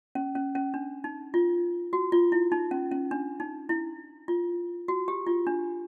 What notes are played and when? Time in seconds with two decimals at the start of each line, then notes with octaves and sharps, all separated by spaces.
0.15 C#4
0.35 C#4
0.55 C#4
0.74 D4
1.04 D#4
1.34 F4
1.93 F#4
2.12 F4
2.32 E4
2.52 D#4
2.71 C#4
2.92 C#4
3.11 D4
3.40 D#4
3.69 E4
4.28 F4
4.88 F#4
5.08 G4
5.27 F4
5.47 D4